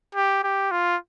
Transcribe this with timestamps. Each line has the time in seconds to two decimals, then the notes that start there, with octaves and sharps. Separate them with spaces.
0.15 G4
0.44 G4
0.71 F4